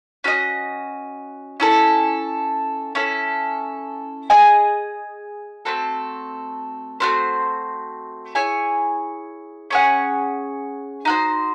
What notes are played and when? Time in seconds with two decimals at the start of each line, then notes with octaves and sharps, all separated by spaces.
0.24 C#4 F#4 A4 D#5
1.60 C#4 E4 A4
2.95 C#4 E4 A4
4.30 G#4 D#5 G#5
5.65 A3 C4 F#4 A4
7.00 A3 C4 F#4 C5
8.35 E4 G#4 C#5 G#5
9.70 C#4 G#4 C#5 F#5
11.05 D#4 F#4 C5